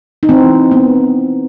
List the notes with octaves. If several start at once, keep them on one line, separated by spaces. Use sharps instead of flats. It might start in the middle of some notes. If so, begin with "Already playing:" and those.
D#4
E3 C4
B3